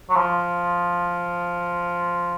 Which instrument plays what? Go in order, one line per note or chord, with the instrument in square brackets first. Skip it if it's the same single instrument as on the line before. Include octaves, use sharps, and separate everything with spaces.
[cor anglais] F#3
F3